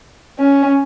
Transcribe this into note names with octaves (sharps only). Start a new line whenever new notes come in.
C#4